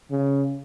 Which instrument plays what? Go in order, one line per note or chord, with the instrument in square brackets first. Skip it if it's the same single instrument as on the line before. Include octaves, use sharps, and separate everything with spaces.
[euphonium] C#3